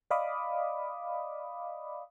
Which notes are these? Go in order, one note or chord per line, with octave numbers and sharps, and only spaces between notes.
D5 D#5 F5 B5 D6 D#6